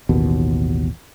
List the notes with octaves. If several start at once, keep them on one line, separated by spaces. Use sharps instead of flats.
A1 D#2 B2